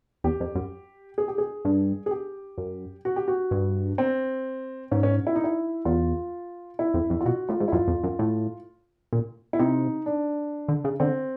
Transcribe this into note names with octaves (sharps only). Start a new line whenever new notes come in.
E2 G4
F2
F#2
G#4
G4
G#4
G2
G#4
G4
F#2
F#4
G4
F#4
G2
C4
G#2 C#4
C#4
E4
D#4
E4
E2 F4
E4
F2
F2
F4
B2 F#4
A2 F4
G#2
E4
F#2 F4
F2
F#2
A2
A#2
E4
C3 D#4
D4
D3
C#3
D3 C4